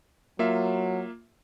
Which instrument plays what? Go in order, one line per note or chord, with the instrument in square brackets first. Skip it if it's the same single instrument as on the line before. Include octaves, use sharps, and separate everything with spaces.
[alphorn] F#3 [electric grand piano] A#3 F4 E5